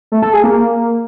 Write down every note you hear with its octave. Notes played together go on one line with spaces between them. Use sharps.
A3
A4
G#4
A#3